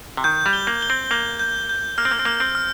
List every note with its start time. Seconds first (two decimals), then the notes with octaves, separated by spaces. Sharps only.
0.17 C3
0.24 D#3 G6
0.46 G3
0.53 G7
0.67 A#3
0.82 G7
0.90 C4
1.11 A#3 G6
1.39 G6
1.69 G6
1.98 A#3 F6
2.05 C4
2.11 A#3
2.19 C4
2.25 A#3 F6
2.40 C4
2.55 F6